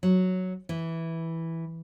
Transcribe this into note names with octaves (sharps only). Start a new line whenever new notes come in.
F#3
E3